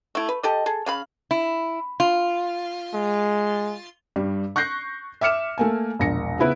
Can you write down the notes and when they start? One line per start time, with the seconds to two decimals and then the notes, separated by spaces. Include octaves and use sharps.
0.15 A3 E4
0.29 B4
0.43 G4 A4 D#5
0.66 G#4 A4
0.86 C#3 F5 B5
1.31 E4
2.00 F4
2.94 G#3
4.16 G2 G3
4.56 C#6 F#6 G6 A#6 C7
5.21 E5 D6 F6 C#7 E7
5.58 A3 A#3 G#5
5.99 E1 A#1 A#6 C#7
6.39 C#3 B3 E4 B4